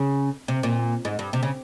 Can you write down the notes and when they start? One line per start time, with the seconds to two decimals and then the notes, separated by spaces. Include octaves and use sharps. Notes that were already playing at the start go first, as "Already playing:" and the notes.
Already playing: C#3
0.48 C3
0.63 A#2
1.05 G#2
1.19 G2
1.33 C3
1.43 C#3